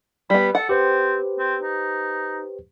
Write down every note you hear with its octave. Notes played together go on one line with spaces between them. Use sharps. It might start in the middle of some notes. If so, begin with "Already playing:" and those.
G3 B3 B5
A4 F#5
C4 G4 B4 C5
C4
D#4